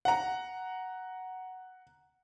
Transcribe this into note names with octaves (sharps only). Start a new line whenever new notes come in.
F#5 A#5